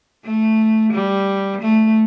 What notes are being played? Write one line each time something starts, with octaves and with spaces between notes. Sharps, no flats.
A3
G3
A3